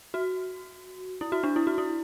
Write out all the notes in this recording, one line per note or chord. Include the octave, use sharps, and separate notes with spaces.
F#4
E4
F#4
D4
E4
F#4
E4